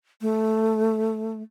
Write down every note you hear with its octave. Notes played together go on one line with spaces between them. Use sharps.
A3